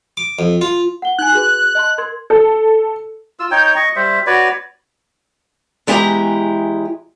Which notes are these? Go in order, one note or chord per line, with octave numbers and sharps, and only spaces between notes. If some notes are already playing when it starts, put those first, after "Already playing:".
D6
F2
F4
F#5 G7
D#4 G#5 F#6
F#4 G#4 B4
D#5 A5 C6
A#4 C6 G#6
A4
F4 E6
D#4 C#5 G5
D#5 C#6
G3 C5 E5
F#4 B4 C#5 D5
E2 G#3 E4 G4 F#5 A#5